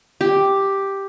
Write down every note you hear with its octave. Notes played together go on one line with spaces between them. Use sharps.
G4